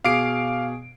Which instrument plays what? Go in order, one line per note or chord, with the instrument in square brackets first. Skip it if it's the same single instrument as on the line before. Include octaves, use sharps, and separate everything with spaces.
[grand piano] B2 G#4 C7 [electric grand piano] F5 D6 D7